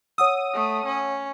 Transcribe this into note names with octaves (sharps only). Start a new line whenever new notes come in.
C#5 F#5 D#6 E6
A3
C#4